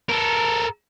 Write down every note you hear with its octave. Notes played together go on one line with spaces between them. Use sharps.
A4 A#4